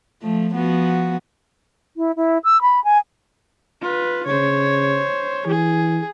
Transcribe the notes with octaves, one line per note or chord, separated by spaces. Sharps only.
F3 A3
F3 B3 F#4
E4
E4
E6
B5
G#5
F4 B4
C#3 C5 C#5
E3 G#4